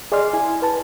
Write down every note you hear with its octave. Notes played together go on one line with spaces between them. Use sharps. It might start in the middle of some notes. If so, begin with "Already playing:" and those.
G#4 D5 D#5 C6 F6
E4 G#5
B4 A5